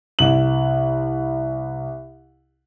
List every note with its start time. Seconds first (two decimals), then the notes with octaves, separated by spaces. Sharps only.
0.19 C2 F#7